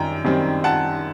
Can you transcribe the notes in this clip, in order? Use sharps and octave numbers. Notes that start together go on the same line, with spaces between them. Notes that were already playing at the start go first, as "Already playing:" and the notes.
Already playing: F#2 D#3 G3 G5 A#5
F#2 D#3 G3 C4
F#5 A5